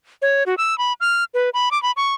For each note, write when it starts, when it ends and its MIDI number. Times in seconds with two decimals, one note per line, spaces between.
0.22 0.44 73
0.46 0.55 66
0.58 0.77 88
0.78 0.93 83
1.00 1.24 89
1.34 1.50 71
1.54 1.69 83
1.71 1.81 86
1.83 1.91 83
1.97 2.14 85